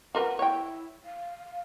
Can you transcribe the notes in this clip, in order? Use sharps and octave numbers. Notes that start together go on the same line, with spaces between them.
F4 A#4 B4 F#5
E4 C#5 G5
F5